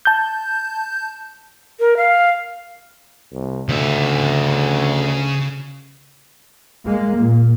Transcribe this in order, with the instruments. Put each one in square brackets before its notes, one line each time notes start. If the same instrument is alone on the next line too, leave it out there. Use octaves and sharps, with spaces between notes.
[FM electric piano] A5 G6
[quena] A#4
F5
[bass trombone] C2
[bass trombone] D2 [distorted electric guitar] C#3 E5
[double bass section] G#3 A#3
A#2